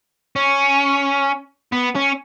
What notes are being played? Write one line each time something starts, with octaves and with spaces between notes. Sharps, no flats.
C#4
B3
C#4